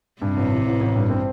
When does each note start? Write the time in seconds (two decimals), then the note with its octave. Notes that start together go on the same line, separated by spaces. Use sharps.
0.22 G2 C3
0.37 A1
0.52 E3
0.67 A1
0.81 A1
0.95 G2
1.10 C4